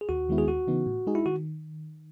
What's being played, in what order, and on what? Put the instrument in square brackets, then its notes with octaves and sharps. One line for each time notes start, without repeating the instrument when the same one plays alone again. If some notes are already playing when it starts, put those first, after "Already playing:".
[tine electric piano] G#4
[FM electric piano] D#2 [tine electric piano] F#4
[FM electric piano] D#3 G#3 B3 E4
[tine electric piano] G#4
[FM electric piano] D#2 [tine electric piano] F#4
[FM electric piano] C#3 E3 B3 D#4
A2
G#3 D#4 G#4
[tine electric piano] E4
[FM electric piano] D#3 [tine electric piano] F#4